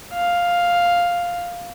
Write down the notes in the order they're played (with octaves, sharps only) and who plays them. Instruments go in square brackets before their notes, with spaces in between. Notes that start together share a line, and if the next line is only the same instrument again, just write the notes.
[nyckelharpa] F5